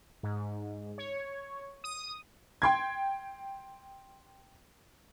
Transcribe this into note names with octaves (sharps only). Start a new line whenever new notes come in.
G#2
C#5
D#6
G5 C6 G#6